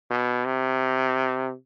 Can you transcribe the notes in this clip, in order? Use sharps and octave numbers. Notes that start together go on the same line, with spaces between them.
B2
C3